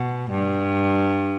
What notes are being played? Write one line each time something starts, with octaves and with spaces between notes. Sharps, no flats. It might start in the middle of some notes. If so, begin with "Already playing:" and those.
Already playing: B2
G2